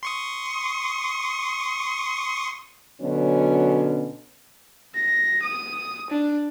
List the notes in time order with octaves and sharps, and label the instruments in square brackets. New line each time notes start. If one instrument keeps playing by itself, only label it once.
[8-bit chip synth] C6 C#6 D#6
[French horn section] B2 D3 F#3 C#4
[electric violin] A#6
D#6
D4